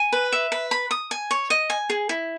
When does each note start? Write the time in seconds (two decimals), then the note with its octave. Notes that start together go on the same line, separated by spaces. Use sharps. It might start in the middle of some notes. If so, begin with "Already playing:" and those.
Already playing: G#5
0.12 B4
0.32 E5
0.52 B4
0.71 B5
0.91 D#6
1.11 G#5
1.31 C#5
1.50 D#5
1.70 G#5
1.90 G#4
2.09 E4